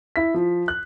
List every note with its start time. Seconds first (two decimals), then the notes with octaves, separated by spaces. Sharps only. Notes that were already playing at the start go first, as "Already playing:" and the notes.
0.16 E4 B6
0.34 F3
0.68 F#6